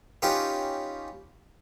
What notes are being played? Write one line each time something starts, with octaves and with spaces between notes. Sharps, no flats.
C#4 D#4 F4 G4 B4